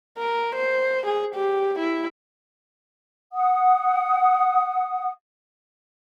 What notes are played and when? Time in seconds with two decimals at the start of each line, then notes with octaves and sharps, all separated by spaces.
0.19 A#4
0.55 C5
1.06 G#4
1.35 G4
1.79 E4
3.33 F#5 D#6